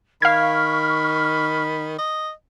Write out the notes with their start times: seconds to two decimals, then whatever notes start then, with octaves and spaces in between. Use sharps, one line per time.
0.22 D#3 F5 B5 C#6 F6 G#6
1.99 D#5